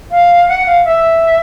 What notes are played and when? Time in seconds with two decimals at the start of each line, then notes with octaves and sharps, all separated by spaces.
0.11 F5
0.48 F#5
0.66 F5
0.85 E5